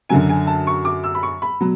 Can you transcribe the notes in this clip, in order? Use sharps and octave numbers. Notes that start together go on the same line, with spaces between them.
F#2 D3 F#3 G#5
G#5
A5
C#6
D6
E6
B5
C#6
B5
B2 F#3